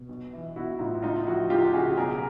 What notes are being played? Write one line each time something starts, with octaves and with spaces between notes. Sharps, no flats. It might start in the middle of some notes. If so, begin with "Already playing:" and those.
Already playing: B2
B1
E3
B1 E4 F#4
A2 D#4 F4
C#2 D#4 F4
F3 E4 F#4
C#2 F4 G4
C#3 F#4 G#4
B1 G#4 A#4